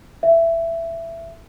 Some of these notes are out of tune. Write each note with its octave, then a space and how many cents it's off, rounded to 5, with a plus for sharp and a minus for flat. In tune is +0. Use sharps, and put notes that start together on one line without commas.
E5 +15